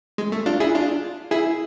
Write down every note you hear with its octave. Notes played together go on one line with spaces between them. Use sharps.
G#3
A3
D4 F4
E4 G#4
D4 F4
E4 G#4